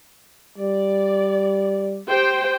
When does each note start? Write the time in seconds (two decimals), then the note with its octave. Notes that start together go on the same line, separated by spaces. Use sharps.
0.58 G3 D5
2.08 G4 C5 G5